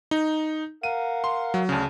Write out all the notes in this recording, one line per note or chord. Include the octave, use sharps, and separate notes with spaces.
D#4
A#4 F5 F#5 D#7
C6
F#3
D2 C#3 D4 G#4